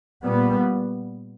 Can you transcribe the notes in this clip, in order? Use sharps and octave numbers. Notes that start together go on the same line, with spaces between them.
A#2 G3 B3